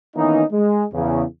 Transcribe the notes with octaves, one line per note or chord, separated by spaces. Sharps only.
D#3 E3 A#3 B3 C#4 D#4
G#3
E2 C#3